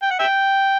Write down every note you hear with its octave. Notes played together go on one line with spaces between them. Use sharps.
G5
F#5
E5 G5